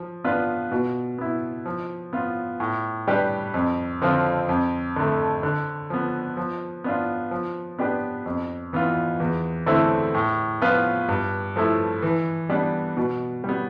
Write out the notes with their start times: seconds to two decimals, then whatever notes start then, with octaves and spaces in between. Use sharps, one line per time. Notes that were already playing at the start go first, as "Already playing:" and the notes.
Already playing: F3
0.24 B3 D4 F4 B4
0.72 B2
1.18 B3 E4
1.66 F3
2.13 B3 F4
2.60 A2
3.07 G3 D4 G4 B4
3.54 F2
4.02 D3 F3 C4 F4
4.49 F2
4.96 D3 A3
5.43 D3
5.90 F3 B3
6.37 F3
6.84 B3 D4 F4
7.31 F3
7.79 B3 D4 G4 B4
8.26 F2
8.73 E3 B3 F4
9.20 E2
9.66 D3 A3 C4 E4
10.14 A2
10.61 F3 B3 F4 B4
11.09 G2
11.56 F3 A3 E4
12.02 E3
12.49 G3 B3 D4
12.97 B2
13.44 G3 B3